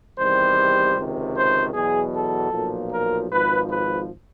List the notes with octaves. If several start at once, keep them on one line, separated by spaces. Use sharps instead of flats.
E2 C3 D#3 G3 C5
C#2 C3 D#3
C5
E2 B2 F#3 G#4
A4
B1 A#2 F3
A#4
G#1 G#2 F3 B4
B4